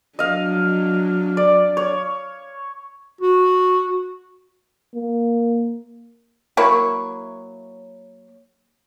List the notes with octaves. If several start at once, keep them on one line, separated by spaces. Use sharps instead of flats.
F#3 D4 D#5 F5
D5
C#5
F#4
A#3
F#3 A#3 E4 C#5